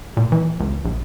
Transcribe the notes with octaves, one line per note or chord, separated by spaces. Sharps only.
A#2
E3
C#2
A#1